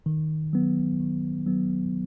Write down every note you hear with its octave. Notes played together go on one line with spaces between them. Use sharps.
D#3
F#3 B3
D#3
F#3 B3